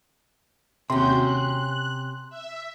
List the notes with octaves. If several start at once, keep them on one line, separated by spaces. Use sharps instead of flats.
D#2 C3 C#4 F#4 C6 G6
F#6
E5